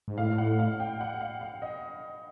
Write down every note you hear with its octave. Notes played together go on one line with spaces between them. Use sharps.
G#2
A2 F5
F#5
F5
G5
F#5
F5
F5
D#5